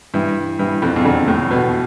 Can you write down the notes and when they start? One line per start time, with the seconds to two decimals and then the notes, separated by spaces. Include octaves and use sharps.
0.14 G2 E3
0.59 G2 E3
0.82 F2
0.96 E2
1.05 F2 D3
1.28 A2
1.51 B2 B3